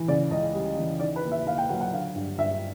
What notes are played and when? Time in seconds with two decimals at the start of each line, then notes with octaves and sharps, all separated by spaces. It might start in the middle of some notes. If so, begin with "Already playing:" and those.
Already playing: E3
0.08 C#3 D5
0.31 C#2 D#5
0.54 G3
0.78 E3
1.00 D#3 D5
1.16 B4
1.24 D#2
1.32 E5
1.46 D#2 F5
1.58 G5
1.69 F#3 F#5
1.81 F#5
1.93 D3 F5
2.15 G2
2.38 G2 E5